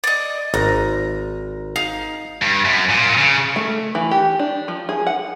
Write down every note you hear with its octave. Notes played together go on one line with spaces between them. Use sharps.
D5 D#5
G#1 A#5
D#4 F5
G2
F#2
A#2
C#3
A3
E3
G4
D4
F3
G#4
F#5